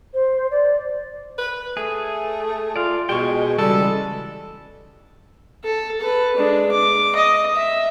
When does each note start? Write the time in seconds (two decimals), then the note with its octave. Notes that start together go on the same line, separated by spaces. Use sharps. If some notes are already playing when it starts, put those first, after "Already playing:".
0.14 C5
0.51 D5
1.38 B4
1.77 A3 G#4
2.76 F4 D5 F5
3.09 B2 G#3 G5 C#6
3.58 C#3 E3 G3 G#3 A4
5.64 A4
6.00 A4 B4
6.36 G#3 D4
6.71 D6
7.16 D#5
7.56 E5